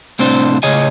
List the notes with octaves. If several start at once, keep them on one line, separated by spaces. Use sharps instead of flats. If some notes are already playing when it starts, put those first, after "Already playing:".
C2 A2 C4 D4 C5
A2 C#3 G#4 C#5 D#5 G#5